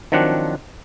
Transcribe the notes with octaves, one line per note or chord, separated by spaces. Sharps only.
D#3 F3 F#3 C4 D4 F#5